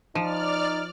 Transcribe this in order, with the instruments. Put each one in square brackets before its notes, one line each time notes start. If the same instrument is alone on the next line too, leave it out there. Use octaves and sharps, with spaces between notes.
[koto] F3 [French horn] D#4 [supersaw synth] D5 F6